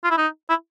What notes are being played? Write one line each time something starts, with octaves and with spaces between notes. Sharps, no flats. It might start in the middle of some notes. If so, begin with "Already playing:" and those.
F4
E4
D#4
E4